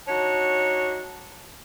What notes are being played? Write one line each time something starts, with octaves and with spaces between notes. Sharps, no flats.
D4 D#4 F#4 C#5